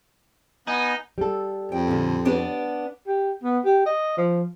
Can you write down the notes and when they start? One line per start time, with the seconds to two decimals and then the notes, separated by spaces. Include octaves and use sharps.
0.67 B3 D#4 G#5
1.18 G3 A4
1.72 F2 G5
1.87 A#2 D3
2.25 B3 D4 D5
3.07 G4
3.44 B3
3.65 G4
3.86 D#5
4.17 F3